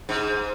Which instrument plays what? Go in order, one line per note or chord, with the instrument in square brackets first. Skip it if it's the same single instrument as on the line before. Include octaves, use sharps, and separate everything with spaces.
[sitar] G#2